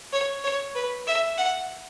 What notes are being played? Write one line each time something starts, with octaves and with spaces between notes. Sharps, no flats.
C#5
C#5
B4
E5
F#5